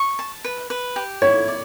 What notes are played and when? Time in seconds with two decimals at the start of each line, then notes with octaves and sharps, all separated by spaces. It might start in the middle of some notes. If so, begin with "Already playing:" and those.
Already playing: C#6
0.19 A5
0.45 B4
0.70 B4
0.96 G4
1.22 E4 C#5
1.48 D5